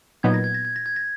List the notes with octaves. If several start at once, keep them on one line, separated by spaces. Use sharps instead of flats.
A#2 F#3 B3 D#4 G#6
A#6
G#6
A#6
G#6
A#6
G#6
A#6